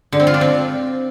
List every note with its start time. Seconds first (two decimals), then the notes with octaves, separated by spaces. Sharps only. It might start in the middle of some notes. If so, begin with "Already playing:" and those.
0.12 D3
0.20 C4
0.27 F4
0.34 D4
0.41 C4